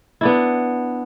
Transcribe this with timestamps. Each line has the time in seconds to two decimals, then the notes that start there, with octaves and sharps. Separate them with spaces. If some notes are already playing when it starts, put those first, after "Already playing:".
0.21 B3 D4 E4